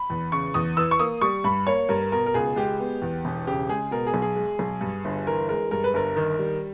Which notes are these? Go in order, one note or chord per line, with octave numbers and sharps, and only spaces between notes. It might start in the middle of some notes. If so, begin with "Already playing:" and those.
Already playing: B5
E2
C#3 C#6
E2 D#6
E3 E6
C#6
A#3 D#6
G3 C#6
G2 B5
A#3 C#5
G2 A#4
B2 A#4
A#4
C#2 G#4
G#3 G4
B3
E2
E1
C#3 G4
G#3 G#4
B2 A#4
G#4
B1
G#4
G#3
B1
G2
G1
E3 A#4
G#3 A#4
G2 A#4
B4
G1 A#4
D#3
G3